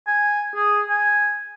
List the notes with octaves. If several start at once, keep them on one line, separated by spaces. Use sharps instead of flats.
G#5
G#4
G#5